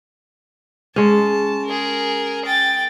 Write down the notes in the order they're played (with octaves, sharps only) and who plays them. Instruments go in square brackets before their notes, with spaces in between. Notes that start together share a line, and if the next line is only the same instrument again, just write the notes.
[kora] G#3 C#4 [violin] A5
[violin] G#4 A#4
G5 A6